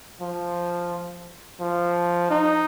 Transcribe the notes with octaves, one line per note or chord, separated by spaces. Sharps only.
F3
F3
D#4